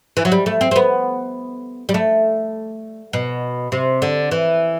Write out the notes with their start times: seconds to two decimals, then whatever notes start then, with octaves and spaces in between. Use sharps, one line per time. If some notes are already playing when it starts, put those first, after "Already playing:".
0.17 E3
0.25 F#3
0.32 G3
0.46 A3
0.61 C4
0.71 C4
0.76 B3
1.89 G3
1.94 A3
3.13 B2
3.72 C3
4.02 D3
4.31 E3